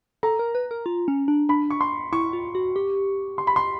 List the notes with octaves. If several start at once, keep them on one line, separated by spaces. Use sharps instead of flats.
A4 A#5
A#4
B4
A#4
F4
C#4
D4
D4 B5
C#6
C6
E4 C#6
F4
F#4
G4
C6
B5
C6